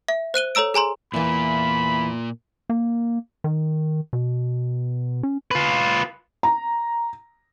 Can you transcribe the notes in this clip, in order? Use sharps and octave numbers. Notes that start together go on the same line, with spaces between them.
E5
C5 F#6 D#7 G7
A4 C#5 A#5 E6 D7
G#4 G#5 A#5 C6
E2 A#2 E3 A#3 B5
A#3
D#3
B2
C#4
F4 B4
A#5